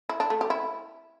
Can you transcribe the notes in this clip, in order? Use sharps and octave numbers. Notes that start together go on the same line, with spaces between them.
E4
D4
A3
G4
E4